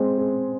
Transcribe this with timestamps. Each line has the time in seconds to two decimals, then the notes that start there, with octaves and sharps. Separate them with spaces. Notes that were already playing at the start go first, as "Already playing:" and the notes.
Already playing: G#3 C4
0.18 G#4